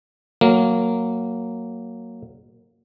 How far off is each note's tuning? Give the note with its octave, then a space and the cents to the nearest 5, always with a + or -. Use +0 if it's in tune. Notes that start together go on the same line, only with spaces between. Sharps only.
F#3 +0 A#3 -10